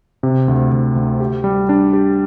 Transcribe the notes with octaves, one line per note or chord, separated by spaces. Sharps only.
C3
D2
D2
D2
G4
G3
D4
G4